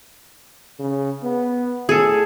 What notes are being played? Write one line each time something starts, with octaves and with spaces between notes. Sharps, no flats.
C#3
B3
A2 G#4 A4